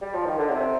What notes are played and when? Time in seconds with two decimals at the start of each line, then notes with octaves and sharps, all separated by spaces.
0.02 G3
0.14 F3
0.26 D#3
0.38 D3
0.50 C3